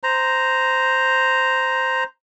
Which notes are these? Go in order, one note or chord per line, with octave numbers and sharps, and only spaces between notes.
C5 A#5